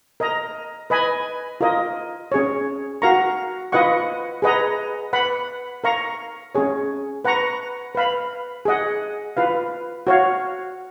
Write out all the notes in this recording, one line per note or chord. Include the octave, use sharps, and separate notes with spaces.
A#4 D#5 A#5
B4 D#5 G#5 B5
F4 A#4 D#5
C#4 G#4 C#5
F#4 A#4 F5 A#5 C#6
F4 B4 D#5 F#5 C#6
G#4 B4 D#5 F#5 A#5
B4 F#5 B5
A#4 F5 A#5 C#6
C#4 G#4 C#5
B4 F#5 A#5 C#6
B4 F5 B5
G#4 D#5 F#5
F4 B4 F5
F#4 C#5 F5